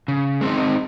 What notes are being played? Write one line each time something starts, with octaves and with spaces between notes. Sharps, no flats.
C#3
G#3 C4 D#4